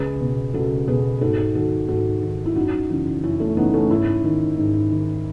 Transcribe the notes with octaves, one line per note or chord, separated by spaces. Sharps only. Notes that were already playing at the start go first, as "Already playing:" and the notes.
Already playing: C#2 G#4 B4
B2
C#2 F#4 A4
B2 G#4 B4
G#2 F#4 A4
D#3 F#4 A4
G#2 F#4 A4
D#3
E4
F#2 D#4 F#4
C#3 E3
F#2 C#4 E4
A3 C#4
C#3 E3 B3 D#4
A3 C#4
G#2 C#4 E4
D#3
G#2
D#3